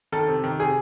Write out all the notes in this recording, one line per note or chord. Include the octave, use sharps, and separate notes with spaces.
D#3 A4
C3
D#3
C3 G#4